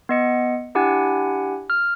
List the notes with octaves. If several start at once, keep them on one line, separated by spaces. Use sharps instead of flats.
B3 D#5 C#7
D4 E4 G4 F#5 G#5
F6